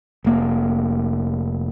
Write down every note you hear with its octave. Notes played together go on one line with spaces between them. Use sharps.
F1 A#3